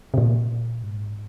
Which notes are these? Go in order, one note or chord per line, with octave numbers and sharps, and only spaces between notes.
C3
A#2
G#2